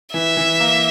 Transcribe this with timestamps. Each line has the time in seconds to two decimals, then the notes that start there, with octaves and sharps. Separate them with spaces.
0.14 E3 E5
0.37 E3
0.60 A#3